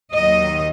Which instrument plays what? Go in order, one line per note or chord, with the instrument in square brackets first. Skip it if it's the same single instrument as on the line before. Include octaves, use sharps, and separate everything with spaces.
[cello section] D#2 D#3 F#3 D#4 D#5